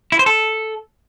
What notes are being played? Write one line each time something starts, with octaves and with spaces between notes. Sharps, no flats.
E4
C5
A4